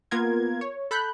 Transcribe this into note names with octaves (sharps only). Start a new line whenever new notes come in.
A#3 B3 F4 A#4 G#6
C#5
A4 B5 F#6 G6